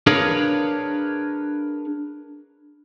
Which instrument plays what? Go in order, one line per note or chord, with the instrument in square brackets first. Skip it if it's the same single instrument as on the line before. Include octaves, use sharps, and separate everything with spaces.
[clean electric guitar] D4 G#4 A#4 B4 C#5 F5